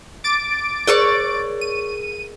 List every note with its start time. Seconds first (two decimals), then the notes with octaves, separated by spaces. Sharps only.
0.24 D6 A6 D7
0.87 G#4 A#4 C#5 D5 C#6
1.61 D#7